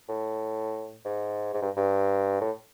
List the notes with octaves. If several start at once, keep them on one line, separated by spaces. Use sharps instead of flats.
A2
G#2
G#2
G2
G2
A2